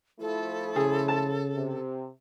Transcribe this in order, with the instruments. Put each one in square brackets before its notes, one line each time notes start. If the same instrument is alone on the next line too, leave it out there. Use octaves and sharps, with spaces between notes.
[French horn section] F3 A3 E4 [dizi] A4
[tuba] C#3 [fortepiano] G#4
[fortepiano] A5
[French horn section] C3